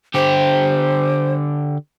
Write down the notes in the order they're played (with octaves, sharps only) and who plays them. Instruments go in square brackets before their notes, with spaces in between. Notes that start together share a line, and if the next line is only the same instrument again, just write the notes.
[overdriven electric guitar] D3 G4 [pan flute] C5